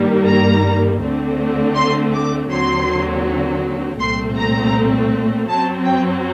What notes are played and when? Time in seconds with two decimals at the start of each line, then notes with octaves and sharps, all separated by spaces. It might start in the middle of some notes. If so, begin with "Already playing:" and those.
Already playing: G2 D#3 G3 A#3
0.26 A#5
1.01 D2 D3 A3 C4
1.76 C6
2.14 D6
2.51 D#2 D3 F#3 C4 C6
3.99 C2 A#2 A3 C4 C6
4.37 A#5
5.49 F#2 F#3 C4 A5
5.85 G5